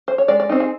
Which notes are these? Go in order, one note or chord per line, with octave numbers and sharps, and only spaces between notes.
C5
C#5
G#3 D5
D5
C4 D#4
G#4